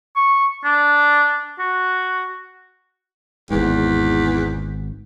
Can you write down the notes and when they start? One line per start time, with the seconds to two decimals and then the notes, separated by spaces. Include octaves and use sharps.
0.16 C#6
0.65 D4
1.59 F#4
3.51 G#1 E2 G#2